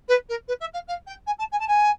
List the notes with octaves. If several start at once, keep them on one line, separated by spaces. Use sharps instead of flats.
B4
A#4
B4
E5
F5
F5
G5
G#5
A5
G#5
A5
G#5